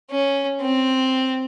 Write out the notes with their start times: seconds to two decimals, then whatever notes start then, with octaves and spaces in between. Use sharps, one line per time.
0.11 C#4
0.61 C4